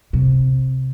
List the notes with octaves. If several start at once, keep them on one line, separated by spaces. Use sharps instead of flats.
C3